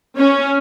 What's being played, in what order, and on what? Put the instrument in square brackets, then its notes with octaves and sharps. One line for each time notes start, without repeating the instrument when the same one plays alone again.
[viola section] C#4